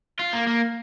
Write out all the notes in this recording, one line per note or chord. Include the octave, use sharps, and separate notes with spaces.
F4
A#3
A#3